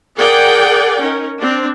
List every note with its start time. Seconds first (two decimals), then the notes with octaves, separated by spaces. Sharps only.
0.17 G#4 A#4 D5 F#5 G5
1.01 C#4 D#4 A#4
1.38 C4 D4